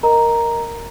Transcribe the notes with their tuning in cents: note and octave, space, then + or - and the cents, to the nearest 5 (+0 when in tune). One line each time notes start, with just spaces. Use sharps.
A#4 +0 D#5 +0 A#5 +0